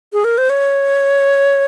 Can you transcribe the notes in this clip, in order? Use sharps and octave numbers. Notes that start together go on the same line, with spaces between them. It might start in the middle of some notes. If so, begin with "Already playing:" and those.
G#4
A#4
C5
C#5